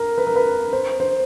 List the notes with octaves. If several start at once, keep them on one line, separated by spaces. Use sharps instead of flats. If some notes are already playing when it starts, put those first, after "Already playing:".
Already playing: A#4
B4
A#4
B4
C5
C5